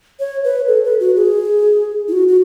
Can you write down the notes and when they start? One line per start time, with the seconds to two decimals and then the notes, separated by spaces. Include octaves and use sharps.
0.20 C#5
0.44 B4
0.68 A4
0.84 B4
1.00 F#4
1.16 G#4
2.08 E4
2.12 F#4
2.28 F#4